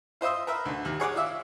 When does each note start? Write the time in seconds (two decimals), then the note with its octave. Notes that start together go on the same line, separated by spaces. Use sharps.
0.21 F4 C5 D#5 E5 C6
0.47 A#4 B4 E5
0.65 D2 D3
0.85 D#2
1.00 G#4 C#5 F#5 D6
1.15 F4 D5 E5